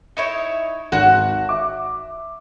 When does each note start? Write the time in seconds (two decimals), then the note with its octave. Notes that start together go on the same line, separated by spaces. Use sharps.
0.17 D#4 E4 C#5 C#7
0.92 G#1 F#4 F#6
1.49 E5 D6